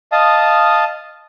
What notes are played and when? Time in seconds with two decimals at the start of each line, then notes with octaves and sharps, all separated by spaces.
0.12 D#5 F5 A5 D#6